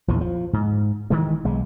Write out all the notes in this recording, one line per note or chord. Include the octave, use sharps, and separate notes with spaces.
A#1 E2 E3
F3
G#2
D#3 E3 G#3
B1 G#3